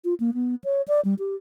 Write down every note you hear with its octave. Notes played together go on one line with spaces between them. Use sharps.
F4
A#3
B3
C#5
D5
G3
G4